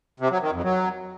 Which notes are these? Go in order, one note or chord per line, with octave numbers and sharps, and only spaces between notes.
C3
F#3
D#3
F2
F#3